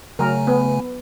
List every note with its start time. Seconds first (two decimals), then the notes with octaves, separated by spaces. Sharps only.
0.19 C#3 F#3 A3 A#4 G#5
0.47 B3